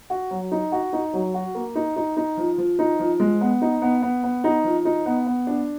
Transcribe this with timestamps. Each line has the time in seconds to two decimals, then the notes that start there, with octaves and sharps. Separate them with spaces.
0.10 F#4
0.31 F#3
0.52 D#4
0.72 F#4
0.93 D#4
1.13 F#3
1.34 F#4
1.55 A#3
1.75 D#4
1.96 D#4
2.17 D#4
2.37 F3
2.58 F3
2.79 D#4
2.99 F3
3.20 G#3
3.41 B3
3.62 D#4
3.82 B3
4.02 B3
4.23 B3
4.44 D#4
4.64 F3
4.85 D#4
5.06 B3
5.26 B3
5.47 D4